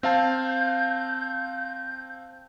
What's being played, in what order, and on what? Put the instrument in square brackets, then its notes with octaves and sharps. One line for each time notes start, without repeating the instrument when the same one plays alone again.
[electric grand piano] C4 F5 A5 [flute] G6